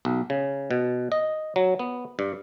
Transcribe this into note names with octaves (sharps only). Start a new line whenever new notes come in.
B1
C#3
B2
D#5
F#3
B3
G2